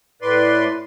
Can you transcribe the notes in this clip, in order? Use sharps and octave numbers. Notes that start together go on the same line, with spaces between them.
A2 B4 D5 C6